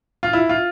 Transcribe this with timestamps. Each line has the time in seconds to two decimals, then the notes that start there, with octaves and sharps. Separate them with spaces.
0.23 F4
0.33 E4
0.49 F4